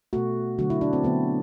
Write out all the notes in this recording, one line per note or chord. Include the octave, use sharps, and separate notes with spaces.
B2 A3 F#4
D3 F#3 A3 F#4
E4
D4
C4
D3 F#3 A3 B3